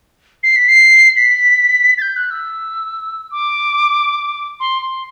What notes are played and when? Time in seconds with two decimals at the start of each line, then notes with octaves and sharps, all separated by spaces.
0.43 C7
0.55 B6
0.68 C7
1.16 B6
1.97 A6
2.01 G6
2.15 F#6
2.30 E6
3.31 D6
4.59 C6
4.82 C6